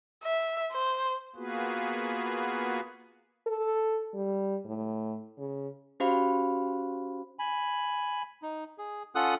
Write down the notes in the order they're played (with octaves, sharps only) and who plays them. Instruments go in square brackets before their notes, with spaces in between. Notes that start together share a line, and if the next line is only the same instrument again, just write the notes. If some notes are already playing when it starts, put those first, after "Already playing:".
[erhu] E5
C5
[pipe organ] A#3 B3 F4 F#4 G#4 B4
[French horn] A4
G3
A2
C#3
[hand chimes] C#4 F#4 G4 C5 F5 B5
[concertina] G#5 B5
D#4
G#4
C#4 F4 A4 F#5 D#6 F#6